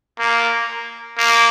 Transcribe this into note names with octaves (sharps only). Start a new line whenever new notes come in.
A#3
A#3